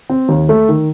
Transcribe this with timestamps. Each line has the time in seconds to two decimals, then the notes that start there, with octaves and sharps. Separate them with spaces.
0.09 C4
0.29 D#2
0.49 A3
0.69 D#3